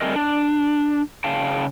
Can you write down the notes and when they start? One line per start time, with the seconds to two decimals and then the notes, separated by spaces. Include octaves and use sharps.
0.01 G3 A3 C4 G#4 A#4 D#5
0.16 D4
1.24 C#3 F5 G5 A5